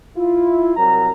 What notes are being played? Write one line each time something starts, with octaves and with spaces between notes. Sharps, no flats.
E4 F4
C2 F#3 C4 A#4 A#5